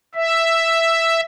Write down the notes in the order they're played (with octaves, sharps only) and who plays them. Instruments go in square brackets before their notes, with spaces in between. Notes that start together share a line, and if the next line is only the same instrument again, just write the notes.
[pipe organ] E5